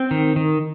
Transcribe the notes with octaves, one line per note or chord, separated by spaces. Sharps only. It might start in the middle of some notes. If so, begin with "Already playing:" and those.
Already playing: C4 G5
D#3
D#3